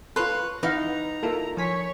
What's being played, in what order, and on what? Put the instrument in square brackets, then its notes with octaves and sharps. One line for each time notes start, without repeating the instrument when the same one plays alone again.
[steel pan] F4 C6 [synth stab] A4 [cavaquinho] B4 C#5
[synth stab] E3 E4 F#5 [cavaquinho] D#4 [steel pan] B4 D#5 F5 [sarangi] A#5
[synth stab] A#3 E4 F4 [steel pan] A4 A#4
[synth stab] F3 G#5 B6 [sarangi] C#5